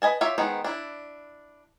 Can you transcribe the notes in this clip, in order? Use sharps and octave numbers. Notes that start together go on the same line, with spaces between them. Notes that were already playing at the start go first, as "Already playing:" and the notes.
B4 D#5 G#5 A5
F4 G4 C#5 E5
D#3 G#3 B3 C5
D4 E4